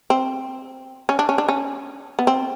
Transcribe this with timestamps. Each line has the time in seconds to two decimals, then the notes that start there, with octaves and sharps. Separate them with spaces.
0.10 C4
1.09 C#4
1.19 D4
1.29 C#4
1.38 D4
1.48 C#4
2.19 B3
2.27 C4